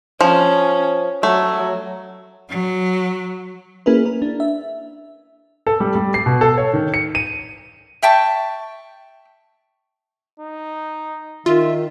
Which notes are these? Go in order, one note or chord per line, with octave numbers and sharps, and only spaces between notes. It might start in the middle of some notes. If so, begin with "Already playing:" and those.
F3 C#4
F#3 A3
F#3
A#3 C#4 E4 G#4 A#4 B4
A#4
D4
E5
A4
G3
G3
C7
B2
A4
C#5
D#3
C#7
D#7
E5 G5 A5 C#6
D#4
D#3 F4 E5